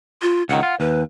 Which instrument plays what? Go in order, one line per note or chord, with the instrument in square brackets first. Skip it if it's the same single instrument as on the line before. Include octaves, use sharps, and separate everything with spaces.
[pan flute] F4
[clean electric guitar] C#2 D#3 [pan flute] F#5
[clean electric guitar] F4
[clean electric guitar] D#2 [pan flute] B4